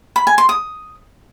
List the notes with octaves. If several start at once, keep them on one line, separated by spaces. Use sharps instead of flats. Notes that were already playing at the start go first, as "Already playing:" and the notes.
B5
G#5
C6
D#6